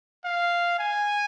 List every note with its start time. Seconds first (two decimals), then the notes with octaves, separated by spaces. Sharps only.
0.25 F5
0.79 G#5